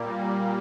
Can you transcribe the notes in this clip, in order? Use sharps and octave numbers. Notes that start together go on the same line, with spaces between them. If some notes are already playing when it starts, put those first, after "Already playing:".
Already playing: A#2 G3 A#3